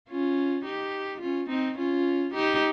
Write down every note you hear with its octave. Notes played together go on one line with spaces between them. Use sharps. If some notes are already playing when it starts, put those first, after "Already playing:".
C#4 F4
D#4 G4
C#4 F4
C4 D#4
C#4 F4
D#4 G4